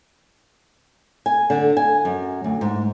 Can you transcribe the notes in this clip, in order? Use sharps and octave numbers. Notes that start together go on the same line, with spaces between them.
G#5
D3
G#5
F#2
D2
G#2